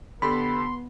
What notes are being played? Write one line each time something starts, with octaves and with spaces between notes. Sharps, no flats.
D3 B3 G4 A4 B5 C6